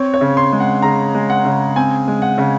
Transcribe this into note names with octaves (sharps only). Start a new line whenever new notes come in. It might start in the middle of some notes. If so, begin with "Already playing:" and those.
Already playing: C4 C#5
C#5
C#3
C6
G#3
F#5
C#3 A#5
G#3
F#5
C#3
C4 G#5
G#3
F#5
C#3